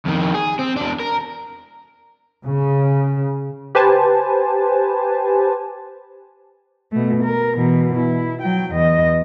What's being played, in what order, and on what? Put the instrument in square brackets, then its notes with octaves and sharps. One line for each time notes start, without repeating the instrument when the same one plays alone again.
[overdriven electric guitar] F2 D#3
G#4
C4
E2 D4
A#4
[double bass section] C#3
[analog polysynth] G4 B4 C5 G#5 A5
[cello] B2 A3
A#4
B2 E3
E4
F#3 G5
E2 D#5